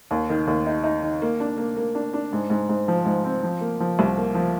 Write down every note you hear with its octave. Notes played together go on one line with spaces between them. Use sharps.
D#2
D#3
D#2
D#4
D#4
D#3
A#3
D4
A#3
A#3
D4
D4
G#2
G#2
G#2
F3
G#2
C4
F3
A#3
F3
C2
A#3
F3